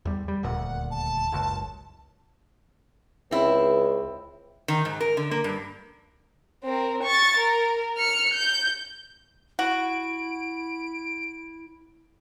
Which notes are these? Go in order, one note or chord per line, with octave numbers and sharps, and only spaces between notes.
E2 G3
G3
D#1 D2 A#2 F#5
A5
F#1 C#2
C#2 C4 E4
D#3
G#2
A#4
D3
A#3
G2
C4 A#4
C#6 A6
A#4
F6 C#7
G6
E4 F#4 D7